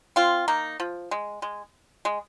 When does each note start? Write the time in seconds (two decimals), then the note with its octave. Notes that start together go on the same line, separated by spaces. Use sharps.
0.16 C4 F4
0.48 A#3 D#4
0.80 F3
1.11 G#3
1.42 G#3
2.05 G#3